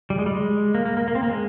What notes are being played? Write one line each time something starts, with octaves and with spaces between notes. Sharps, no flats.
G3
G#3
G3
G#3
A#3
A#3
A#3
A#3
C4
A#3
G#3